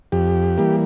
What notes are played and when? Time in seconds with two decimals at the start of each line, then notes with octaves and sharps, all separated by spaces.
0.12 F2 G4
0.58 E3 G3 A#3